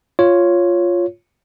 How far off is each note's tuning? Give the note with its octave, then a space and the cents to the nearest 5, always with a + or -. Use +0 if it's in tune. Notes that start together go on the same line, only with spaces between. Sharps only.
F4 +0 C#5 +0